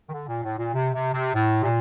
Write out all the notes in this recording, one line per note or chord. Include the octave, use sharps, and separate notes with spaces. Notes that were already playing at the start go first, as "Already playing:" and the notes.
D#3
D3
A#2
A2
A#2
C3
C3
C3
A2
C3
A#2